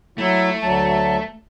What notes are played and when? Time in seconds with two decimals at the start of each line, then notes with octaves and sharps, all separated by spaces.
0.18 F#3 A3 E4
0.62 D2 F#3 A5